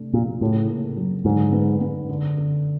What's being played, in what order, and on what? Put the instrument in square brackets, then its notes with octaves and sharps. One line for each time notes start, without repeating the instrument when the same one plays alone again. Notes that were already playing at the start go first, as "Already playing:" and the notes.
Already playing: [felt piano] C3 A3 D4
[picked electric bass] A#2 [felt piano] F3
[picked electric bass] A2 [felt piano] C#3
[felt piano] A#3
F#3
[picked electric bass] G#2 [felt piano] D3
[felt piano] B3
B3
D3
D3